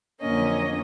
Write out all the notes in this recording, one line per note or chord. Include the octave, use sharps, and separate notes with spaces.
F2 D3 F#3 A#3 C#4 D#5